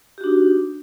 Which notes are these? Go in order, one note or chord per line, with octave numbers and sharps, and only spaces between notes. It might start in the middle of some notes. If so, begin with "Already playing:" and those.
D4 D#4 F#4 G4